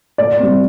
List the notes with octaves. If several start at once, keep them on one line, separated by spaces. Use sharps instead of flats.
A2 D5
G3 C4